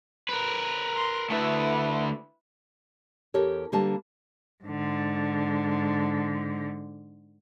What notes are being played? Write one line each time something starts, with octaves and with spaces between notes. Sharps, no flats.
A#4 B4
C6
D2 A3 E4 B4
E2 G4 A4 A#4 C#5
D3 G3 A#3 B4 A5
G#2 D3